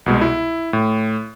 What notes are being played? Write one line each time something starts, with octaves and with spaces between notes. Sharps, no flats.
C2 B2 G#3
E4
A2